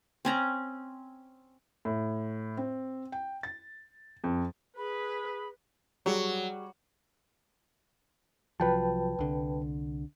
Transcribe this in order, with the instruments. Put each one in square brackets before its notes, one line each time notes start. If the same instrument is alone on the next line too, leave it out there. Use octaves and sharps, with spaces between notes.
[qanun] C4 C#4 A#5
[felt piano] A2
C4
G5
A6
F2
[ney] G#4 [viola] B4 [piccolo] B5
[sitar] F#3 [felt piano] G3 F#4 G#4
[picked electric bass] C2 F3 F#3 [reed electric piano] B4 G5 A5
[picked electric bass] C2 D3